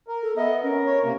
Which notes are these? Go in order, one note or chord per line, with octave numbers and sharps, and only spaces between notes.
A#4
A4
B3 D#5 E5
C#4 A#4
C#5
C3 A#3